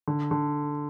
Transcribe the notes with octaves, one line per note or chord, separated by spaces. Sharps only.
D3
D3